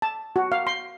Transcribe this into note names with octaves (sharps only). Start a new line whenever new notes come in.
A5
F#4
F5
C6